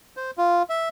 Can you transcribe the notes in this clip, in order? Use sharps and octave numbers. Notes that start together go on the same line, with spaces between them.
C5
F4
E5